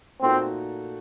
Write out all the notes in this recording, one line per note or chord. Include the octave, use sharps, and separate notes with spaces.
A#2 A3 C4 D#4 F#4 A4